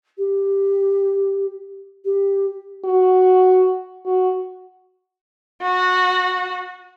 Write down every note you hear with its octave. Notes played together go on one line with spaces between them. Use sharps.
G4
G4
F#4
F#4
F#4